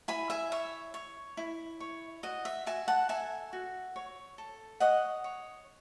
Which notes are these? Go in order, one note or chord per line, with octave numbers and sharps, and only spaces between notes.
E4 G#5 B5
E5 G#5
C#5 E5
C#5
E4
C#5
F#4 D#5
E5
F#4 E5 G#5
F#5 A5
A4 E5 G#5
F#4
C#5
A4
C#5 D#5 F#5
C#5